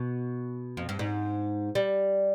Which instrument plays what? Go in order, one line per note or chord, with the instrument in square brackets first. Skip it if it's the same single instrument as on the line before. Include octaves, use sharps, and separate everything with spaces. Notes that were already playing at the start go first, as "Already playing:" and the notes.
Already playing: [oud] B2
F2
G2
G#2
G3